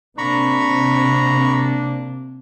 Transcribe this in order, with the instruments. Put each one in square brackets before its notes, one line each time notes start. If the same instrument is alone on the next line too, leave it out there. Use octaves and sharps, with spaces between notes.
[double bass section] C3 [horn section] A#3 D4 [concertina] A#5 B5 C#6